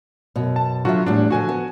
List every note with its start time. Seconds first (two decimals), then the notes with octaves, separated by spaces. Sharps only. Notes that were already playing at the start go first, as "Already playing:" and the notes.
0.36 F#2 B2
0.56 A5
0.85 D3 F#3 F4 F#4 E5
1.06 E2 A2 G3 D4
1.30 D3 F3 F#4 A4 G#5
1.48 B3 A5